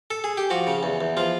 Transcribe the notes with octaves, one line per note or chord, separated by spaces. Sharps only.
A4
G#4
G4
F3 F#4
C#3
E2
E2
F3 F4